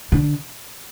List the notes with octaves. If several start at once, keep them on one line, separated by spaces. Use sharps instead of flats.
D3